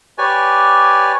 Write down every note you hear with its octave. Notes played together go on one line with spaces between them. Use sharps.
G4 B4 C#5 D5 G#5